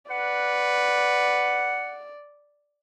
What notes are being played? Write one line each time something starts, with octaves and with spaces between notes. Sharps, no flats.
B4 D5 F#5